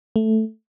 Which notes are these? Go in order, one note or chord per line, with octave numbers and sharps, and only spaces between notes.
A3